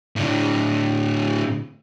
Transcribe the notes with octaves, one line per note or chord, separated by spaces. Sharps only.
A2 D3